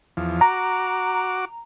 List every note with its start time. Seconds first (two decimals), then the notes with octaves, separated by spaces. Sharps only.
0.17 E2 F3
0.41 F#4 A#5 D6